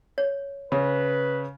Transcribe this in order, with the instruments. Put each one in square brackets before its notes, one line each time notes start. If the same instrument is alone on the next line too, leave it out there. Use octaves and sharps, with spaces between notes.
[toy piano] C#5
[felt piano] C#3 [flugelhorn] B4